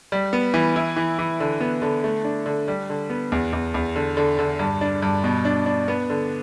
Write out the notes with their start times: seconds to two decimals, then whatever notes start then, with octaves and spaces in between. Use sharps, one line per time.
0.12 G3
0.33 B3
0.54 E3
0.76 E4
0.96 E3
1.19 E3
1.40 D3
1.61 B3
1.82 D3
2.04 A3
2.24 D4
2.46 D3
2.68 G3
2.90 D3
3.10 B3
3.32 E2
3.53 E2
3.74 E2
3.96 D3
4.17 D3
4.39 D3
4.59 G2
4.81 D4
5.02 G2
5.24 B2
5.45 D4
5.66 D4
5.88 B3
6.10 D3